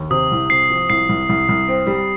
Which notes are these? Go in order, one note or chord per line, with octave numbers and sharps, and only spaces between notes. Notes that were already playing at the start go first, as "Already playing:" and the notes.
Already playing: D#2
C3 D#6
C2
C3 C7
F3
C2 C7
C2
C2
C2
C4
G3